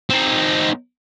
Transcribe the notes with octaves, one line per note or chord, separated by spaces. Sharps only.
C4 D#4